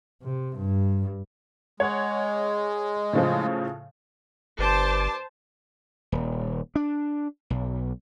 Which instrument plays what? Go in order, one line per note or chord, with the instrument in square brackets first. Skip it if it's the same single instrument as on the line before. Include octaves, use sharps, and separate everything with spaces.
[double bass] C3
G2
[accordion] G#3 [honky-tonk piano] C#5 F#5
[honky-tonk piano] A2 C#3 F3
[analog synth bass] G1 [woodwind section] G2 D6 [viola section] C5 A5
[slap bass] D#1
D4
B1